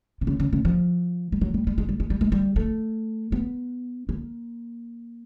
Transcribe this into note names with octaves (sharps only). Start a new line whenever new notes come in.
C3
C#3
C#3
C#3
F3
G3
F#3
G3
G3
G#3
G3
G#3
G3
G#3
G3
A3
B3
A#3